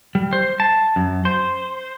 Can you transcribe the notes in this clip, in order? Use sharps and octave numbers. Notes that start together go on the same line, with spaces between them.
G3
C5
A5
F#2
C5